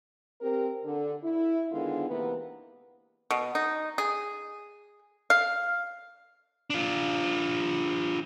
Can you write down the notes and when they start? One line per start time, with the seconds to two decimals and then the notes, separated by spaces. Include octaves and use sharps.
0.41 C4 G4 A#4
0.84 D3
1.22 E4
1.71 D3 D#3 G#3 B3 D4 F4
2.08 C3 E3 A#3 B3 A#4 B4
3.31 B2
3.55 D#4
3.98 G#4
5.30 F5
6.70 D4 F4